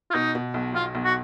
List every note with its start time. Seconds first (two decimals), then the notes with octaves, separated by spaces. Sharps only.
0.11 F4
0.14 B2 D#4
0.35 B2
0.54 B1
0.74 B1 F4
0.95 B1
1.05 F#4